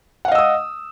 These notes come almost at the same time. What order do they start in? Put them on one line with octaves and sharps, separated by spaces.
F#5 F5 D#5 E6 D#6